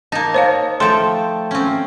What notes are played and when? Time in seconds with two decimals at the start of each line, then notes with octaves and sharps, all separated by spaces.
0.12 A#3 D#4 A5
0.34 C5 C#5 F5
0.80 F3 A3 A4 G5 C6
1.51 C4 C#4